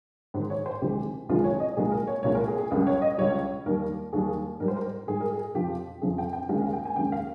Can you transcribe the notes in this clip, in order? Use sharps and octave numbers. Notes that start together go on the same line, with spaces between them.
G#2 D#3 G#3 C5
C#5
C5
C2 C3 D#3 G#3 G4
C2 C3 D#3 G#3 F4
C#5
D#5
C2 A#2 G#3 G#4
A#4
C#5
C2 A#2 G#3 C#5
A#4
G#4
G#4
C#2 C#3 G3 A#4
C#5
D#5
C#2 C#3 G3 C#5
D#2 D#3 G3 A#4
D#2 D#3 G3 G#4
G#2 G3 A#4
C5
A#4
G#2 G3 G#4
A#4
G#4
F2 C3 F3 G4
F2 C3 F3 G#4
G5
G5
D#2 C#3 G#3 F5
F5
G5
G#5
D#2 C#3 G#3 G5
F5